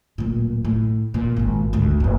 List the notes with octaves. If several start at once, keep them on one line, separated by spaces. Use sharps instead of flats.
D1 A#2
A2
A#2
G#1 A#2
G#1 D2
F1 A#3